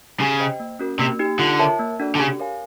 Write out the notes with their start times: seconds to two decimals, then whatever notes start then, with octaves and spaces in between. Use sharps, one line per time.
0.20 C#3 G4
0.40 C5 D#5 G5
0.60 A#3
0.79 C#4 F#4 A#4
0.99 C3 A#3
1.19 D#4 G4
1.39 D3 F4
1.59 A#4 C#5 E5 A5
1.79 A#3
2.00 D4 F#4 A4 D5
2.15 D3
2.19 C#3 G4
2.39 A#4 C#5 F5 G#5